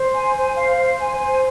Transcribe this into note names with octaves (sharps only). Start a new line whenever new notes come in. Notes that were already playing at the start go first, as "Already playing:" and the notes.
Already playing: C5
G#5
C5
F5
C5
G#5
C5